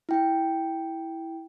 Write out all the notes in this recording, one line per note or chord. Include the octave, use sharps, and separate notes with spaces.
E4 G5